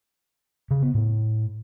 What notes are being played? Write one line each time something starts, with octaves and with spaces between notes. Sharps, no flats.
C#3
B3
A2